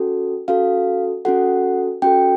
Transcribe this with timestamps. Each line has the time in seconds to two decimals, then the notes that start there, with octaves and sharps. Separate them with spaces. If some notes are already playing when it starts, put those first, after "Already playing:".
Already playing: C#4 F#4 A4
0.48 C#4 F#4 A4 F5
1.25 C#4 F#4 A4 F#5
2.02 C#4 F#4 A4 G5